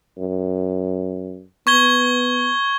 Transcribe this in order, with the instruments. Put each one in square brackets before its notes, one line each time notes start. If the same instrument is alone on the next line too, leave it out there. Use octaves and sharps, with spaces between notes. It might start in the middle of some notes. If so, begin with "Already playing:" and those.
[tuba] F#2
[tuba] B3 [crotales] C#6 G#6 G7